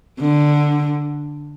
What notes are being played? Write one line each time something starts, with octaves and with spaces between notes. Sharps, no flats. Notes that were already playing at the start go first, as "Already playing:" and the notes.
D3